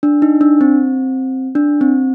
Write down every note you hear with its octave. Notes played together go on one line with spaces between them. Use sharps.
D4
D#4
D4
C4
D4
C4